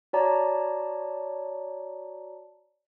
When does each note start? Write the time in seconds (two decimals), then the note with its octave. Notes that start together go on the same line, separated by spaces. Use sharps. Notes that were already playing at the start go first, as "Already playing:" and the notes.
0.13 F#4 C#5 D5 A5 A#5